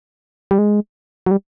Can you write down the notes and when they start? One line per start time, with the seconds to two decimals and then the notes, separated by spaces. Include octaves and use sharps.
0.51 G3
0.58 G#3
1.26 F#3
1.31 G3